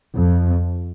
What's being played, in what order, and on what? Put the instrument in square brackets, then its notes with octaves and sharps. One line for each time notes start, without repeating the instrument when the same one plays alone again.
[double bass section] F2